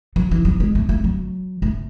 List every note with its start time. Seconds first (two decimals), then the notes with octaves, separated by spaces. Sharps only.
0.16 F#3
0.31 E3
0.45 F#3
0.60 G#3
0.75 A3
0.89 A3
1.04 F#3
1.62 A3